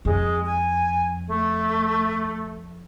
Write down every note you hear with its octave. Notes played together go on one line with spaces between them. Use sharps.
F2 G#3
G#5
A3